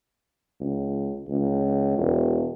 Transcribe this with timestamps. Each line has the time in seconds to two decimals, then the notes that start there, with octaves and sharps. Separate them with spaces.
0.60 C#2
1.28 C#2
1.98 E1